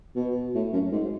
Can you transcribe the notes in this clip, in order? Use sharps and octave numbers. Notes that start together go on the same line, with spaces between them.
B2
A2
F#2
G#2